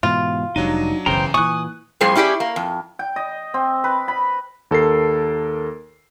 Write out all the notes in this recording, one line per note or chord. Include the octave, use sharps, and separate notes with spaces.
G#2 B2 E3 F4
F1 A#2 F#3 G3 D4 D#4 D#7
F#1 B1 C#3 E3 C5 G5 A#5
A#2 E3 G#5 C#6 D#6 F#6
F2 A2 G3 G#4 C5
C#4 E4 G4 G#4 D5
A#3
F2
G5
D#5
C4
B4
B5
D#2 A4 A#4 C7